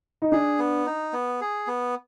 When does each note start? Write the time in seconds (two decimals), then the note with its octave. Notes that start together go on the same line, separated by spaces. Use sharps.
0.22 D#4
0.32 D4 G#4
0.59 B3
0.87 D#4
1.13 B3
1.41 G#4
1.67 B3